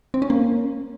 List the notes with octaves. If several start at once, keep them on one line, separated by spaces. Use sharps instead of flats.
C4
C#4
A#3